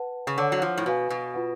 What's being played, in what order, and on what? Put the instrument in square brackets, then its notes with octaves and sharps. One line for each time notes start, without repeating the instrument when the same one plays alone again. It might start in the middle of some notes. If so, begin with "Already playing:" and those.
Already playing: [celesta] B4 F#5 A5
[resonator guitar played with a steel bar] C#3
[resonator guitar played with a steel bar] D3 [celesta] C#5 F#5 A5
[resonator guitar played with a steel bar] F#3
F3
A2
[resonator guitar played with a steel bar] B2 [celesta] F#4 B4 F5 G#5
[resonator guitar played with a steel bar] B2
[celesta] F4 B4 F#5